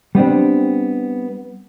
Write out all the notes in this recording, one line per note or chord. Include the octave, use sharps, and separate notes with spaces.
G3 B3 C4 D4